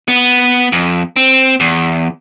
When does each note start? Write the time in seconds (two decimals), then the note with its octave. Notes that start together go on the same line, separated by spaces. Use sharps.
0.08 B3
0.72 F2
1.16 C4
1.60 E2